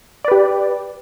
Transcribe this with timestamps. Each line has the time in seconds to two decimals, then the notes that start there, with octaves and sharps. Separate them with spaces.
0.24 D5
0.28 B4
0.31 G4